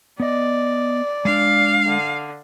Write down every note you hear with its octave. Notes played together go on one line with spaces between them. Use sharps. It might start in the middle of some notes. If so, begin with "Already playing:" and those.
B3 D5 D#5
G#3 D4 F5
D3